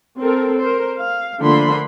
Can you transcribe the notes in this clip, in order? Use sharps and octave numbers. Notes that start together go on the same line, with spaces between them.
C4 A4 A#4
A#4 C5
F5
D3 F3 A3 A#3 B5 C6